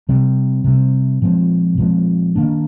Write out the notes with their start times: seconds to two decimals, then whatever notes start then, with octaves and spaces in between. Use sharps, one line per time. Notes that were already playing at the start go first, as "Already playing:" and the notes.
0.09 C3 G3 C4
0.64 C3 G3 C4
1.22 A#2 F3 G#3 C4
1.78 A#2 F3 G#3 C4
2.35 D#3 A#3 D4